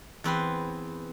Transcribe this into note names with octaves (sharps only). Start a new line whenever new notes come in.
E2 C4 B4 C6